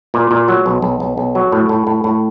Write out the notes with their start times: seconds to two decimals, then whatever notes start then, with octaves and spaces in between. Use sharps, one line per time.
0.14 A#2
0.31 A#2
0.48 F#3
0.66 B1
0.82 B1
1.00 B1
1.18 B1
1.35 F#3
1.52 A2
1.69 A2
1.87 A2
2.04 A2